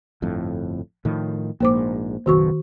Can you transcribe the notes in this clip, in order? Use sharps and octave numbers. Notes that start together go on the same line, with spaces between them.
G1 F2 A2
A2 D#3 F3
A#1 G#2 A#3 C5 D6
F#1 B1 B2 D#3 F#4 C#6